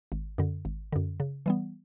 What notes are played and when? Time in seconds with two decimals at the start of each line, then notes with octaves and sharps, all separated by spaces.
0.12 G#1
0.38 F#2 D3
0.65 G#1
0.93 F#2 D3
1.20 C#3
1.46 E3 G3 B3